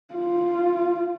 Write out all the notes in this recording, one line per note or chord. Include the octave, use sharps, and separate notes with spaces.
F4